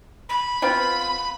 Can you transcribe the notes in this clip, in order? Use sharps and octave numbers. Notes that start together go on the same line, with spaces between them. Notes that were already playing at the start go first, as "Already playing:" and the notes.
B5
B3 C4 F4